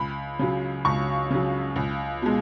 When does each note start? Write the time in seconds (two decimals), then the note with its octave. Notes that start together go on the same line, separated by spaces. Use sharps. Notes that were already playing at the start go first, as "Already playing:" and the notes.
Already playing: C#2 B5
0.39 C#3 F#3
0.85 C#2 C#6
1.30 C#3 F#3
1.76 C#2
2.22 B2 G#3